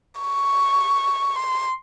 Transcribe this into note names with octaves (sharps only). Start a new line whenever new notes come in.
C#6
C6